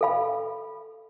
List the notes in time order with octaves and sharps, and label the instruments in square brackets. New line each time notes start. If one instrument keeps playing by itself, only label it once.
[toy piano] A4 F5 B5